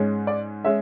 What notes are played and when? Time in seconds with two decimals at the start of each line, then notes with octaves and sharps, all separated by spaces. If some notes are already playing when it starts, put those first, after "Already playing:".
Already playing: G#2 G#3 C#4
0.27 D5
0.64 G#3 C#4 E5